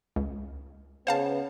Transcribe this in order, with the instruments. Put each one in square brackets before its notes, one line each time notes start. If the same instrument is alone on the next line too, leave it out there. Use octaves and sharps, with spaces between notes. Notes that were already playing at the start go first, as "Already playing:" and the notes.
[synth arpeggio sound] C#2
[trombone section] C#3 B3 [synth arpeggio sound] C5 F5 A5